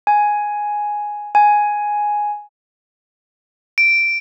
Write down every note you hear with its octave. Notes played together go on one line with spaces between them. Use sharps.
G#5
G#5
D7